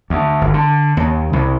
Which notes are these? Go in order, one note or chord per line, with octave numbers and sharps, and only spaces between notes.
D2
G1
D3
D#2
C2